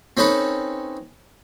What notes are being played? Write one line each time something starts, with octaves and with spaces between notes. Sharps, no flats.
C4 C#4 D#4 A4 B4